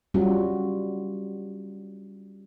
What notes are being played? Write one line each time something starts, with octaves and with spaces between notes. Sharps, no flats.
G3 C#4 F4 F#4